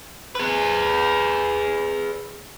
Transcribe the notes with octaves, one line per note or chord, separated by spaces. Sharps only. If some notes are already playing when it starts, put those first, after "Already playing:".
G#4 B4